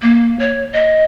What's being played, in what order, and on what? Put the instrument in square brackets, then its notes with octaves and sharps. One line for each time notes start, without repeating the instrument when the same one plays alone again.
[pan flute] A#3
C#5
D#5